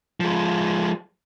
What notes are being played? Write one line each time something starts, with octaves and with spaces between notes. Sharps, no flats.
F3 G#3